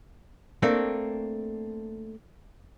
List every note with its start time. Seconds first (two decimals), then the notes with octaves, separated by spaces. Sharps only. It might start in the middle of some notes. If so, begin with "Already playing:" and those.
0.63 A3 A#3 C4 D4